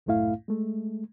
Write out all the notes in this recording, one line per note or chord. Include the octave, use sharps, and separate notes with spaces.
C2 F#2 A2 A3 E4 F5
G#3 A3